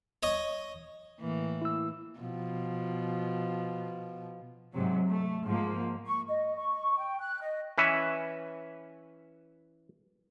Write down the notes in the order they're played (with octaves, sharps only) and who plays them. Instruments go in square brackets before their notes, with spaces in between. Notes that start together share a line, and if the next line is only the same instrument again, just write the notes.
[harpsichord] C#5 D#5
[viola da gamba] A2 E3 A#3
[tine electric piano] E4 E6
[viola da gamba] B2 F3
[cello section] G#2 C3 F#3
A3
G#2 F3 A#3
[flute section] C#6
D#5
C#6
G5
F#6
D#5
[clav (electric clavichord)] E3 C#4 B4 E5